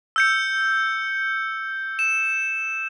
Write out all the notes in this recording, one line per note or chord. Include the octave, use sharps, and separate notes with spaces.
E6 G6 C#7
E7